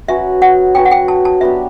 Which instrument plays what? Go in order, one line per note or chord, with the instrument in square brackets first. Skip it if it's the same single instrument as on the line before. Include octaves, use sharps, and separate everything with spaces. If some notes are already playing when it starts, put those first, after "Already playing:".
[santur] F#3 C#4 F#4 B4 [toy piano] E5
[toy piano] F#5
[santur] F#3 C#4 F#4 B4 [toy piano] G5
[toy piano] F#5
G5
A5
A5
[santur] F#3 B3 D4 G4 [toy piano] E5